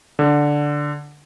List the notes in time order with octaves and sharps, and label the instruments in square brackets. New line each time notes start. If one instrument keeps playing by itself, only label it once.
[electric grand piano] D3